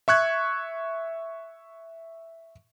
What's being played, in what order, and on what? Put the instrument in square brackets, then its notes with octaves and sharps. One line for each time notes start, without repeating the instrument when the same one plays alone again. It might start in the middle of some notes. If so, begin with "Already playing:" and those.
[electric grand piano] E5 C#6 F#6 G#6